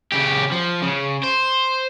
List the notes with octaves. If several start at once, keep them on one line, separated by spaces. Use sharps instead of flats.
C#3 G4
F3
C#3
C5